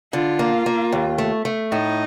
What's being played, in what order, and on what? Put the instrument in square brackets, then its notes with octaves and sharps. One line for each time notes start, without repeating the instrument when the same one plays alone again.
[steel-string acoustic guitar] D3 [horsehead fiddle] F4
[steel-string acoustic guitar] A#3
A#3
D#2
A3
A3
[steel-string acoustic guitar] A2 [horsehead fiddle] D#4